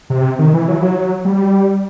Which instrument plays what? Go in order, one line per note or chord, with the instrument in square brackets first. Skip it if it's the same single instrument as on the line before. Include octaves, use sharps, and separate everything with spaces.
[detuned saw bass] C3
D#3
E3
F#3
E3
F#3
G3